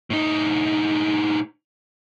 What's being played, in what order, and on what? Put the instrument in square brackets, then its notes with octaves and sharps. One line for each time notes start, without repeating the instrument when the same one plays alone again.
[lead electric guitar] A2 D#4